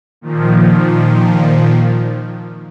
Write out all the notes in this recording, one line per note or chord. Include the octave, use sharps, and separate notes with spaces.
A#2 D#3 F3